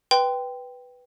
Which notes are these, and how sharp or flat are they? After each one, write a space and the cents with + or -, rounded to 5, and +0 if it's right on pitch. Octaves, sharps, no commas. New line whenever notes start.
B4 +0 G5 +0 C6 -25